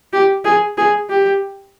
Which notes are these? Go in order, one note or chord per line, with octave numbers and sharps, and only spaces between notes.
G4
G#4
G#4
G4